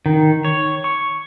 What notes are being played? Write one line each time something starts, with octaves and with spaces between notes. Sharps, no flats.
D#3
C#5
C#6